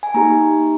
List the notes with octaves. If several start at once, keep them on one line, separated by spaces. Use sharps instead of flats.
G#5
A#3 D#4 G4 A#5